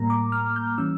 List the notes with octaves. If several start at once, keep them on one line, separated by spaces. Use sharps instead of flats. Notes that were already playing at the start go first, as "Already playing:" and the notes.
Already playing: A2 G3 A#3 A#5
D6
F6
G6
E3 G3 C#4 E6